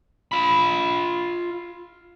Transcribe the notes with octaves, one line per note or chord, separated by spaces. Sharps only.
F4 B5